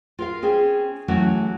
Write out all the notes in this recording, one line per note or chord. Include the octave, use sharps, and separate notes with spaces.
F4 A#4 F5
C4 C#4 G#4
E3 F#3 A3 C#4 E4 F#4